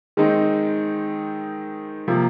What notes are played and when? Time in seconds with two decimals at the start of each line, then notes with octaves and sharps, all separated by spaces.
0.17 D#3 G#3 C4 D#4
2.08 C3 F3 A#3